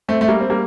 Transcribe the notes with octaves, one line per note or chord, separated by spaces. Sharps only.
A3 C4
A3
G3 A#3
C4
G3 A#3